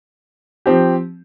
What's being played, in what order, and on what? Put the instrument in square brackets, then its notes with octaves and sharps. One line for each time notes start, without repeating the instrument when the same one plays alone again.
[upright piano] F3 C4 G4